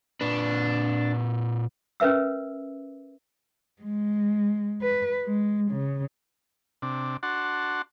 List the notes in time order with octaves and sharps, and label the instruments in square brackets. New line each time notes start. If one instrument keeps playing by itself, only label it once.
[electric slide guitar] A#2 B4 [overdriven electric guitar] D4
[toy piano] C#4 A#4 B4 E5 E6
[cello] G#3
B4
G#3
C#3
[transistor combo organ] C3 D4
D4 F#4 F#5 A5 C6